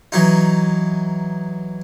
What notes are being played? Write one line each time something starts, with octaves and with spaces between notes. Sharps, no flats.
E3 F#3 D#4